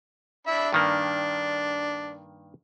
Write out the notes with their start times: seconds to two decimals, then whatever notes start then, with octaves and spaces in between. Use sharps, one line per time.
0.47 D4 E5 B5
0.73 G2 D#3 A#3 D4